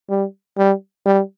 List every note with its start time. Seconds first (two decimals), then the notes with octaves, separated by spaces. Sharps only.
0.09 G3
0.58 G3
1.06 G3